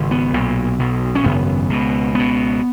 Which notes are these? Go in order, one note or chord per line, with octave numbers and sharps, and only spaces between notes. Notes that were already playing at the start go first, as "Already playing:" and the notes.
Already playing: G#1 C#3
B3
B1 A#2
B1 B2
C#4
G#1 F#2 C#3 B3
C#2 B2
C#2 B2 B3